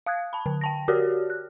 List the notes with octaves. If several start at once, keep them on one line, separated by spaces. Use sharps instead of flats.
F5 D#6 F#6 G#6
A5 B5
D3
G5 A5 A#6
F#4 G4 A#4 C#5 D5 F6
F#6